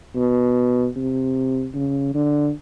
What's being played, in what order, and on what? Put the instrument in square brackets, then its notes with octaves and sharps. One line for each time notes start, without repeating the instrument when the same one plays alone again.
[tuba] B2
C3
C#3
D3